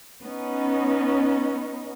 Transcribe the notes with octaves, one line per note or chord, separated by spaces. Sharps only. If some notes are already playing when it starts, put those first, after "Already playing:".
B3 C#4 D#4